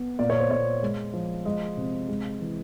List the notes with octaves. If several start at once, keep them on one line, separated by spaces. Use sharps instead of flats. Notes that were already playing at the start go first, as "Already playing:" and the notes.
Already playing: B3
A#2 D5
C#5
C5
A#2 C#5
G#3
F3
G#3 D#5
C3
G#3
E3